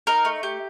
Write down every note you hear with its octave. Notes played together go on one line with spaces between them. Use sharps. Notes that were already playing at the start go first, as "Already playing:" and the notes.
D#4 A#4
A3
G4